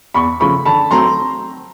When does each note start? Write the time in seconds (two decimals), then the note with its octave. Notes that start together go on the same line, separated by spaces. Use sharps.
0.14 E2 B5 C#6
0.40 C#3 F3 A3 B5 C#6
0.65 D3 A5 B5
0.91 F#3 A3 C4 A#5 C6